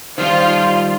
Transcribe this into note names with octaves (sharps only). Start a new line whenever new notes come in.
D#3 F3 G3 F4